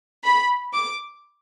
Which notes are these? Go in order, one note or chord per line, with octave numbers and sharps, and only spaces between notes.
B5
D6